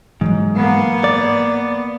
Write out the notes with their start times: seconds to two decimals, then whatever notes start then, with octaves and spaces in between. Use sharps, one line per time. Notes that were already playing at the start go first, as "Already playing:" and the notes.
0.21 G#2 E3 F#3 G#3
0.56 A#3 B3
1.04 D5